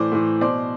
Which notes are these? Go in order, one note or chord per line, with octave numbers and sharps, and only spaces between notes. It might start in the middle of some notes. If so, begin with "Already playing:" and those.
Already playing: A2 E3 C5 D5
A2 E3
B2 C5 D5